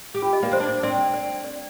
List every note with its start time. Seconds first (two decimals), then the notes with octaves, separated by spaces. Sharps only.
0.14 G4
0.22 F4
0.33 D#5
0.43 A#3 D5
0.51 C4 C5
0.60 D4
0.83 C4 D5
1.14 D5
1.44 D5